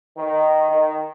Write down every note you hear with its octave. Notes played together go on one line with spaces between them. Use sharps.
D#3
D#3